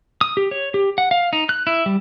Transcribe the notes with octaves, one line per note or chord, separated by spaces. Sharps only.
D#6
G4
C#5
G4
F#5
F5
D#4
F#6
E4
G3